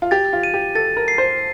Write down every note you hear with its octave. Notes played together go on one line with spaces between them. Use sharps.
F4
G4 A6
F4
D#7
G4
A4 A6
A#4
C7
C5